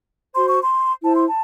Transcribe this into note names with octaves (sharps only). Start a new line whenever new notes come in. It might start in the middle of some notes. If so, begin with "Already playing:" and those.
F#4 C5 C6
C#6
C6
E4 C5 A5
C6
A5